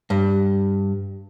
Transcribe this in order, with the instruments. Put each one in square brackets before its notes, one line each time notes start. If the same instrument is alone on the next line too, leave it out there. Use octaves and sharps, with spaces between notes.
[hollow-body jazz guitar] G2